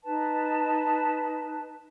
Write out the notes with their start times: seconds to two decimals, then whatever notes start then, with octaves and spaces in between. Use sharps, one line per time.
0.05 D#4 B4 A5